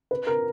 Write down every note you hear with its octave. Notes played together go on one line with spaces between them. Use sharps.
B4
A#4